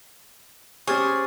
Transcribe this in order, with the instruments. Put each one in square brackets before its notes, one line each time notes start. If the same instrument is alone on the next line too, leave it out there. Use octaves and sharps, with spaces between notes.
[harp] C#4 G4 C5 [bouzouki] G#4 [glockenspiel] C#6 F6 A6